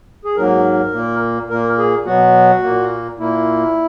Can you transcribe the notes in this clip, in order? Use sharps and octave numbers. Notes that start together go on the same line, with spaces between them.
G#4
G#2 F#3 A#3 A#4
A#2 A#3
A#2 A#3 A#4
G#4
B2 F#3 B3 F#4
A#2 A#3
A#2 A#3 E4